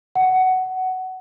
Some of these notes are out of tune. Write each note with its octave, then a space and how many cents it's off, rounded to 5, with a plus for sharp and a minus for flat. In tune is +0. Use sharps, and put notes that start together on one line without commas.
F#5 +15